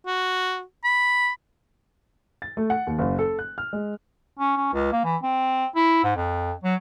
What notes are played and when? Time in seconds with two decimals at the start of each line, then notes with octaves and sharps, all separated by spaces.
0.07 F#4
0.84 B5
2.42 A6
2.57 A3
2.70 F#5
2.87 D#2
2.99 F#1
3.19 A4
3.39 F#6
3.58 F6
3.73 G#3
4.39 C#4
4.57 C#4
4.73 C#2
4.92 A#3
5.05 E3
5.23 C4
5.76 E4
6.04 G#2
6.16 F2
6.64 F#3